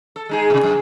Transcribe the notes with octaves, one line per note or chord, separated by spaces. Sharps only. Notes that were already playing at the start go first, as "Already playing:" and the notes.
A4
G#3 D#4 G#4
A2 C3
F#2